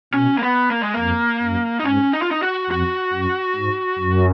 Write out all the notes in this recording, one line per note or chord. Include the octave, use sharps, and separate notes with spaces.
B2 C#4
A#3
B3
A#3
G#3
A#3
F2
F#2
D#4
G#2 C#4
D#4
F4
D#4
F#4
F2 F#4
F#2
G#2
F#2